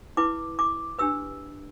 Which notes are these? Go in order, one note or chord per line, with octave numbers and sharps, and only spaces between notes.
E4 B4 D6
D6
D4 G4 B4 E6